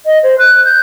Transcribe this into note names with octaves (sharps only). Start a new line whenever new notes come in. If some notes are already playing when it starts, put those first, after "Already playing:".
D#5
C5
F#6
G6